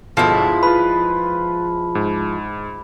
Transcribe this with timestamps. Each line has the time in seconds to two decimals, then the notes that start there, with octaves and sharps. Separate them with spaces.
0.17 G1 B2 F3 G#3 E4 A4
0.63 F4 B4 B5
1.95 G#2